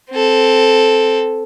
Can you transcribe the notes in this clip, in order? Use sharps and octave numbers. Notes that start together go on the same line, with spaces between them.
C4 A4